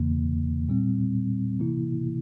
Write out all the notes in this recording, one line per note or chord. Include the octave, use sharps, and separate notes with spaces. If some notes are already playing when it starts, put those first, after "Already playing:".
Already playing: E2 C#3 E3 A#3
A#2 G3 C4
C3 E3 A#3 E4